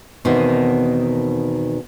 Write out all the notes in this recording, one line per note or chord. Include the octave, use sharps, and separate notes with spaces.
E2 B2 D#3 A#3 C4 D#4